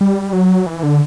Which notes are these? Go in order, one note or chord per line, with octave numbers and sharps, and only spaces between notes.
G3
F#3
E3
D3